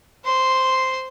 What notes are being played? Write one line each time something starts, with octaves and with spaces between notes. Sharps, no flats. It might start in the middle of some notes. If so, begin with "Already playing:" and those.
C5 C6